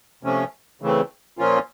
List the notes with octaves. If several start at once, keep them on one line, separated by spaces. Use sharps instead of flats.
C3 F3 A3 C#4
C#3 E3 A3 C4
A#2 F3 A#3 C#4 F4